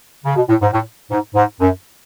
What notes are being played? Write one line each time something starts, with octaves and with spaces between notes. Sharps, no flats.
C#3
B2
A2
G#2
A2
G#2
G#2
F#2